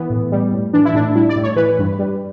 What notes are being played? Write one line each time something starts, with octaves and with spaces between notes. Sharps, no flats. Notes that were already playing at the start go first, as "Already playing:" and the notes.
Already playing: E3 B3
A2
G3
A2
E3 D4
E4
A2 D4
G3 E4
D5
A2
C#5
E3 B4
G2
G3